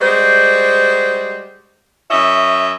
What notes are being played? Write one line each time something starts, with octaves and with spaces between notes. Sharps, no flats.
G3 G#3 F#4 C5
F#2 C#5 D#5 E5